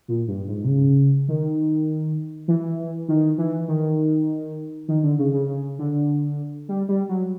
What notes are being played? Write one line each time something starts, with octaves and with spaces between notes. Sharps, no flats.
A#2
G2
G#2
C3
C#3
D#3
E3
D#3
E3
D#3
D#3
D3
C#3
C#3
C#3
D3
G3
G3
F#3